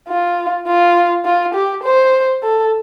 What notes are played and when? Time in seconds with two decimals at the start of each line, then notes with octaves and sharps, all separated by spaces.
0.08 F4
0.67 F4
1.25 F4
1.54 G4
1.83 C5
2.43 A4